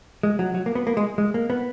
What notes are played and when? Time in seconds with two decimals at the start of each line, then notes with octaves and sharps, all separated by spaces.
0.23 G#3
0.39 F#3
0.54 F#3
0.66 A#3
0.75 B3
0.87 A#3
0.97 G#3
1.18 G#3
1.34 A#3
1.50 B3